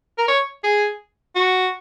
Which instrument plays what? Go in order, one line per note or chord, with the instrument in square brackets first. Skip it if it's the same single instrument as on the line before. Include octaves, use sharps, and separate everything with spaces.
[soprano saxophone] A#4
C#5
G#4
F#4